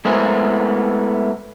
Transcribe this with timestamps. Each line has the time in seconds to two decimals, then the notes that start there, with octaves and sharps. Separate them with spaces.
0.05 G#3 A3 B3 E4 A#4 C5